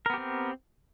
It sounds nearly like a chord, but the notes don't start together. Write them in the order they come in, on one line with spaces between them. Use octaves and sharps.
A#4 B3 G4 C4